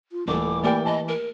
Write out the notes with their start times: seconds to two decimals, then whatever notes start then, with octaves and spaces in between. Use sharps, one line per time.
0.12 F4
0.28 D#1 E3 A3 D6
0.64 A3 A#3 G4 A#4 D5 G5
0.86 D#5 A5
1.08 A#4